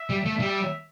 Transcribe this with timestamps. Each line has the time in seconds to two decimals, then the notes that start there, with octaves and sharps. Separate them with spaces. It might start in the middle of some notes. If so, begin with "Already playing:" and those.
Already playing: E5
0.10 G3
0.25 A3
0.40 G3 E5